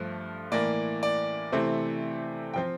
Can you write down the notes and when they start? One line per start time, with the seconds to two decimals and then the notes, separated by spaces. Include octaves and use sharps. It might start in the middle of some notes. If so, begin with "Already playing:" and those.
Already playing: G2 F3 A3
0.52 A2 E3 A#3 D5
1.03 D5
1.52 C3 E3 A3 C4
2.54 F3 C4 G5